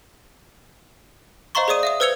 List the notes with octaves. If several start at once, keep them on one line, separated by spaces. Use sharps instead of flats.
C5 D#5 F5 A#5 C6 C#6
G#4 C5 D5 D#6 D#7
E5 F5 D#6
B4 C5 E6 G#6 C#7 F7